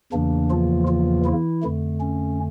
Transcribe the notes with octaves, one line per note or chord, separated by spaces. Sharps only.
E2 C#3 E3 A#3 D4
F3 F4
F3 F4
E3 E4
F2 D3 A3
C#4